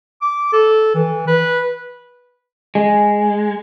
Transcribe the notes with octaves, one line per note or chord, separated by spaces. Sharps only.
D6
A4
E3
B4
G#3